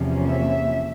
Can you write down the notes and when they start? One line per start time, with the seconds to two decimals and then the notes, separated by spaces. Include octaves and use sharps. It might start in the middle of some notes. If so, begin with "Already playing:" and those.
Already playing: E2 C3 F3 A#3 C#4
0.27 E5